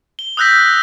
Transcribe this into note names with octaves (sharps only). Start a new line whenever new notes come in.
G7
D#6 E6 F#6 G6 A#6 B6